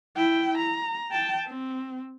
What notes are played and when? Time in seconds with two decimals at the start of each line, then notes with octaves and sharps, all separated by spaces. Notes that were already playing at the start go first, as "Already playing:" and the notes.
0.16 E4 G5
0.58 A#5
1.11 G5 A5
1.46 C4